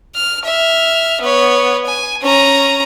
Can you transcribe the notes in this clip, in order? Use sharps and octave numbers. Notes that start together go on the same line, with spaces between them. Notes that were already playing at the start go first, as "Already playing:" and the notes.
F6
E5 F6
B3 C#5
G#5
C#4 A#5